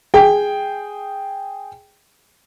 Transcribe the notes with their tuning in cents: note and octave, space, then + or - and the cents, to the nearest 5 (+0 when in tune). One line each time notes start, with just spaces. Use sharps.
G#4 -5 G5 +0